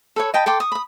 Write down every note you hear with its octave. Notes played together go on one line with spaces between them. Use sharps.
A4 B4 C#5
D#5 G5 A5 B5
A4 G5 C6 D6
C#6 D#6
B5 D#6